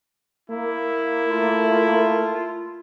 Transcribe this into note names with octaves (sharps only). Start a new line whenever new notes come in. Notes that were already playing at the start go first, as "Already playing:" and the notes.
A#3 E4
A3 F4
F4